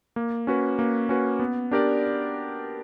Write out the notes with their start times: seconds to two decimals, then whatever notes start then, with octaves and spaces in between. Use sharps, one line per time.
0.16 A#3
0.47 C#4 F#4 B4
0.79 A#3
1.09 C#4 F#4 B4
1.40 B3
1.71 D4 G4 A#4 D5